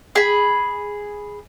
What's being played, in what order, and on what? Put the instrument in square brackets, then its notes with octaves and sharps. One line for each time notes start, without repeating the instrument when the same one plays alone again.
[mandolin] G#4 B5